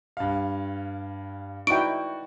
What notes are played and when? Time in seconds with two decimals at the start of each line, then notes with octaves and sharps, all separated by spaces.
0.17 G2 F5
1.67 D#4 E4 F#4 D5 G5 C#6 D7